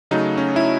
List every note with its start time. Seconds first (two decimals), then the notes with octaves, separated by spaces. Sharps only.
0.11 C#3 F#3 A3 D#4
0.37 C#4
0.56 E4